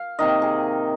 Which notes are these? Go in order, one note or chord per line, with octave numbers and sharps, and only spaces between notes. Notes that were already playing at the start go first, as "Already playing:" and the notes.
Already playing: F5
C3 D#3 A#3 D#4 D#5
G#4